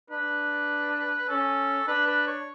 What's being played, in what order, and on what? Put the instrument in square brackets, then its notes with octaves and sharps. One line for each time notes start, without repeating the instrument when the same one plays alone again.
[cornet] D4 [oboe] B4
[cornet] C#4 [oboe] A4
[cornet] D4 [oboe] B4
[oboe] B4
C#5